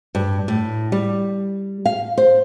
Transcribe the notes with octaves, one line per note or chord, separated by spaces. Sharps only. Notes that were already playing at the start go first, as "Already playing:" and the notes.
G2
A2
G3
F5
C5